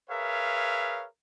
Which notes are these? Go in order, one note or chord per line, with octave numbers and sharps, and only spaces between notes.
G#4 A#4 B4 C#5 E5 F5